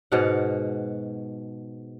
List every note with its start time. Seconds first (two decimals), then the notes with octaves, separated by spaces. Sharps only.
0.12 G#2 B2 F5 F#5